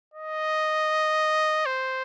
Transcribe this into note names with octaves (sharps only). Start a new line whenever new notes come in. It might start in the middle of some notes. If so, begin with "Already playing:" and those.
D#5
C5